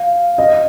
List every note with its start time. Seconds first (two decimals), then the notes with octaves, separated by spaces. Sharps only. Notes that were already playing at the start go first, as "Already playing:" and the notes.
Already playing: F5
0.38 D#5